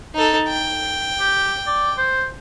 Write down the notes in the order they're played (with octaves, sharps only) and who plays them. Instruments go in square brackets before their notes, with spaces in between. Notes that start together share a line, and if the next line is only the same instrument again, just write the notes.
[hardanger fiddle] D#4 A4
G5
[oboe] G4
D5
C5